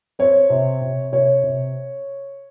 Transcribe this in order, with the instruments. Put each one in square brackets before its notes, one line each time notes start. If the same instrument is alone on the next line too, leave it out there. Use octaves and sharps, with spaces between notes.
[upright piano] C4 C#5
C3
C3
C3 C#5
C3